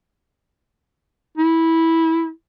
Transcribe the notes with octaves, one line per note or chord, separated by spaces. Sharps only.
E4